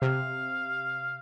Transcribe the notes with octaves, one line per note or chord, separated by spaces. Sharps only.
C3 F5